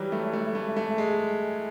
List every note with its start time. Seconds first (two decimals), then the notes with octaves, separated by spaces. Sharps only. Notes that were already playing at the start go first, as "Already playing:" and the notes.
Already playing: E3 F#3 G3
0.12 A3
0.33 A3
0.55 A3
0.77 A3
0.98 G#3